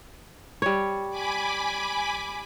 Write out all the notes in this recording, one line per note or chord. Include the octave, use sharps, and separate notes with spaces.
G3 C#5
G#5 B5 D6